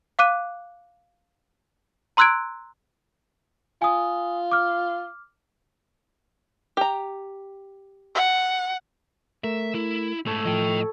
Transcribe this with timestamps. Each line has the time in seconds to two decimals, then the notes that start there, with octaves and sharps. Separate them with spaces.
0.19 F5 D6 F#6 D#7
2.17 A#5 C6 E6 F#6 G#6 D7
3.82 F4 G#5 D#6
4.51 D6 F6
6.77 G4 A#5
8.15 F#5
9.44 A3 A#4 E5
9.75 E4
10.26 G#2 A3 A4 C#5
10.45 A2 F3 D#5 G5